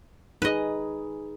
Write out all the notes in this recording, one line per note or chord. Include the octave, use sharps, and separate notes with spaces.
D#4 G#4 B4 D#5